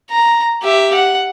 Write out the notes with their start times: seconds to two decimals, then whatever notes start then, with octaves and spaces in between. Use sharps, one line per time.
0.10 A#5
0.62 G4 E5
0.94 F#5